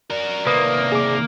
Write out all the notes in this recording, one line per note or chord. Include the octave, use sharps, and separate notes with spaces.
F#4 A#4 D5
C3 D#3 A#3 B4 D#6
G#4 D6